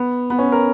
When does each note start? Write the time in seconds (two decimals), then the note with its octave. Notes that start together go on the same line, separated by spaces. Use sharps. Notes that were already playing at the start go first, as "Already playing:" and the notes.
Already playing: B3
0.30 B3
0.39 C#4
0.52 A#4